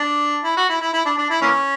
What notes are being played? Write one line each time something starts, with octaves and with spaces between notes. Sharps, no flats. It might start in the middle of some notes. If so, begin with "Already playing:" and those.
Already playing: D4
E4
F#4
E4
E4
E4
D4
D4
E4
E3 A#3 C#4